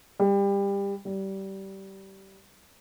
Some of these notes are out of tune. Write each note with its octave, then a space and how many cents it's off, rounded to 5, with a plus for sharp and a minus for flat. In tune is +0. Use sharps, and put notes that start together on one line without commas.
G3 +25
G3 -20